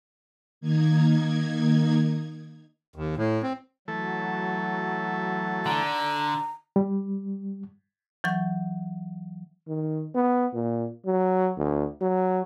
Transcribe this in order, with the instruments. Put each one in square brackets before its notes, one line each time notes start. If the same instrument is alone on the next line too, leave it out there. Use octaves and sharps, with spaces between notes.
[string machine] D#3 A#3 D#4 G#6
[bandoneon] D#2
A2
C4
[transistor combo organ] E3 A3 A4 [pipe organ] F#3
[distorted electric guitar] D3 [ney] A#5
[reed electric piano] G3
[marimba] E3 F#3 C#6 G6
[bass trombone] D#3
B3
A#2
F#3
D2
F#3